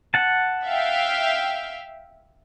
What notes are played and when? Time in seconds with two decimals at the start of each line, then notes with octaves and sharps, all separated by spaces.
0.14 F#5 A5
0.65 E5 F5 G5